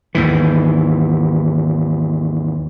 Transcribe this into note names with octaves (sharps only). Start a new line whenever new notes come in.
D#2 G#2 E3